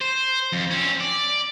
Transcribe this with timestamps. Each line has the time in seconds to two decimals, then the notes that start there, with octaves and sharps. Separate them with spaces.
0.01 C5
0.53 F2
0.71 C4 C#4
1.00 D5